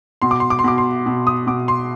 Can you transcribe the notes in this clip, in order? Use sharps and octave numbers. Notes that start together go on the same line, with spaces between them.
B2 C6
D6
C6
D6
C6
B2 D6
C6
B2
D#6
B2 D6
C6